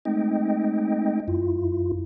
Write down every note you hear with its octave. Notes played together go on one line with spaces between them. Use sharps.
G#3 A3 C4 D#4 D#5 G5
F#2 E4 F4